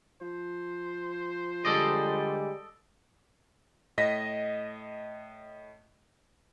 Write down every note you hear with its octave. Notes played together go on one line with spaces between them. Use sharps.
F3 C5
D3 G3 G#3 A4 D5 D#5
A2 D#5 A#6 B6